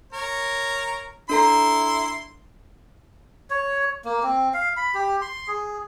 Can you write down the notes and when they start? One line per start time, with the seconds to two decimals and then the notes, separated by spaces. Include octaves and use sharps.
0.13 A#4 C#5
1.29 D4 E4 A4 A#5 C6
3.50 C#5
4.05 A#3
4.23 C4
4.54 F5
4.77 B5
4.94 G4
5.22 C6
5.48 G#4